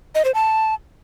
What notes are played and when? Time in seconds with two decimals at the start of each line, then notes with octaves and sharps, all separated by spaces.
0.15 D#5
0.25 C5
0.35 A5